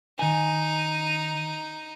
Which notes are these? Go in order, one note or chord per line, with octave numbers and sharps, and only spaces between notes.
D#3 D#4 G#5